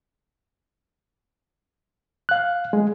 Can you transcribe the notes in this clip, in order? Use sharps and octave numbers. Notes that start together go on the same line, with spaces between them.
F5 F#6
G#3